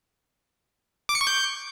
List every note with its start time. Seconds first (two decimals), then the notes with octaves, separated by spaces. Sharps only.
1.09 D6
1.15 C#7
1.21 C#6
1.27 G6